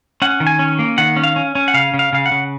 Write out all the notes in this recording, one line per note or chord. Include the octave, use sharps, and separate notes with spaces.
C#4 F#5
D#3
G#5
C#4
A#3
D#3 F#5
C#4
F5
C#4
C#4
F#5
C#3 F5
C#3
F5
C#3 F5
F#5
C#3